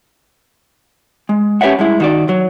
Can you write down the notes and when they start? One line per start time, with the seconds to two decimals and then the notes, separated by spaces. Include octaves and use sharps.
1.29 G#3
1.61 C#4 G4 B4 C#5 E5 F#5
1.79 G2 G#3 E4
2.00 D#3 F#4 D5
2.29 F#3